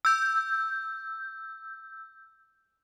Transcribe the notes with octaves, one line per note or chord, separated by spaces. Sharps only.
E6 G6